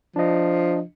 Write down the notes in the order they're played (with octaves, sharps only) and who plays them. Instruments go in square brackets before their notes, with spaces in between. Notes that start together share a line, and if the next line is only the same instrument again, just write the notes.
[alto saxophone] F3 [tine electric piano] D4 D#5